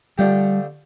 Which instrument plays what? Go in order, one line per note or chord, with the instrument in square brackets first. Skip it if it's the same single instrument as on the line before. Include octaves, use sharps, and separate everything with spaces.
[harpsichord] D3 F3 A3 D4 G4 [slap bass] G3